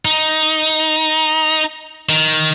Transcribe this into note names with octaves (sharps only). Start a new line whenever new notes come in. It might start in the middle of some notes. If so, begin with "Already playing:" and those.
D#4
D#3